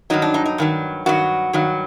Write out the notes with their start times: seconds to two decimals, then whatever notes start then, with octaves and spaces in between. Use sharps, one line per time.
0.10 G2 D#3 F#3 D#4
0.22 D4
0.34 D#4
0.46 D#4
0.58 G2 D#3 F#3
1.06 G2 D#3 F#3 F#4
1.53 G2 D#3 F#3